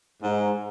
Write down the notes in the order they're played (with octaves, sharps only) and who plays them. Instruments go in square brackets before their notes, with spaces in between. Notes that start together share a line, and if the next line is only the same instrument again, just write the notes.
[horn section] G#2